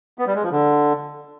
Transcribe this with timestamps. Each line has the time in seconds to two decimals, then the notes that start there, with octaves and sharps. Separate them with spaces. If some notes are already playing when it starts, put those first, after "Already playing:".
0.19 B3
0.27 G3
0.35 G#3
0.43 F3
0.51 D3